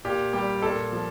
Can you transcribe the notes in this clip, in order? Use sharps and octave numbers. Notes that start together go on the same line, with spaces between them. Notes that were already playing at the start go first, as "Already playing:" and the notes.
A#2 G4
G3 G4
A#2 A4
F3